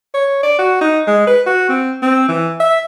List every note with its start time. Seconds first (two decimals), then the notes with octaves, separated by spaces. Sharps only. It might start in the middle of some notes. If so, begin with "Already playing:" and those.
0.14 C#5
0.43 D5
0.59 F#4
0.81 D#4
1.07 G#3
1.27 B4
1.46 F#4
1.69 C4
2.03 C4
2.28 E3
2.60 E5